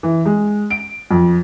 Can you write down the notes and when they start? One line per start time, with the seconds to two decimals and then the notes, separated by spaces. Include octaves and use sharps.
0.03 E3
0.25 G#3
0.70 D7
1.11 F2